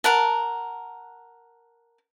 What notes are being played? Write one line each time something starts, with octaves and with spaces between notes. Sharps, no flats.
A#4 F#5 A5